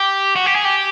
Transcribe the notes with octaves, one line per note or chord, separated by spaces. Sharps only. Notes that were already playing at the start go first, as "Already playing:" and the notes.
Already playing: G4
F#4
G4
G#4
G4